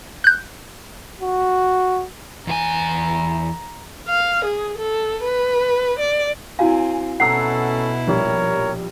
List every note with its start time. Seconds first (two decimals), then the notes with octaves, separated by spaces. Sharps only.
0.24 F#6 G6
1.20 F#4
2.47 E2 F4 G#5 A#5
4.08 F5
4.45 G#4
4.78 A4
5.24 B4
5.99 D5
6.59 C4 E4 F#4 F5 G#5
7.20 B2 C#4 E4 A4 F#5 A#5 E6 C7
8.07 A#1 G3 A#4 C#5